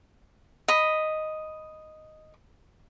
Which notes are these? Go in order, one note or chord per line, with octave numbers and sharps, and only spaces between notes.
D#5 B5